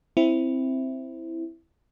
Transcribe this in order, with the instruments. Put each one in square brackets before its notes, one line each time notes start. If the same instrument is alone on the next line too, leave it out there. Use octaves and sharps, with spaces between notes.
[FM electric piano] C4 E4